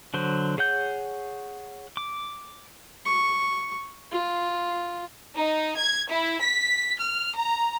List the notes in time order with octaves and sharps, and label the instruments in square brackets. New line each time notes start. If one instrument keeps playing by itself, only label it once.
[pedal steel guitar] D3 F#3 C5
G#4 C#5 F#5 G6
D6
[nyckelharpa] C#6
F4
[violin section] D#4
G#6
E4
B6
F6
A#5